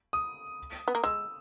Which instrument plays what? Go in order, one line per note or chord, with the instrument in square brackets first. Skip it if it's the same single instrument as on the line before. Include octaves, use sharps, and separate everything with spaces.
[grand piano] D#6
[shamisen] B3
A#3
[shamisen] G#3 [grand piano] E6